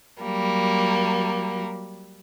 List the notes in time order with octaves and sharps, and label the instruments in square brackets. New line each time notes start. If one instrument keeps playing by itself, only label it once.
[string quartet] F#3 G3 A#3